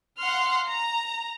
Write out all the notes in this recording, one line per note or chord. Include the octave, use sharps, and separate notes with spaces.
F5 F#5 C6 F6
A#5